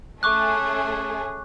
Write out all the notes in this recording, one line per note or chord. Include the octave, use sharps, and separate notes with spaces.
A3 C#4 G#4 C#6 D6 F#6